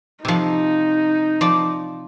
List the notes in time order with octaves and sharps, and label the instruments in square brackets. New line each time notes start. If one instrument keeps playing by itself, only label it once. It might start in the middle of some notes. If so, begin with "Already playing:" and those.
[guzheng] C3 F3 [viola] D#4
[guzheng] F3 D5